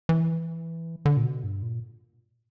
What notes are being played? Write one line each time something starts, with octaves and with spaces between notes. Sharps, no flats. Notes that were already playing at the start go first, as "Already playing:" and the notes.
E3
D3
A#2
B2
G2
A#2